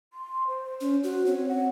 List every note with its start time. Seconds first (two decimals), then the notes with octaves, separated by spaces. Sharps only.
0.13 C6
0.48 C5
0.81 C#4
1.04 F#4
1.26 C4 C#5
1.49 F#5